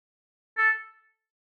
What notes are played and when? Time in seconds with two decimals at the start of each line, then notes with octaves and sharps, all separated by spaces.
0.58 A4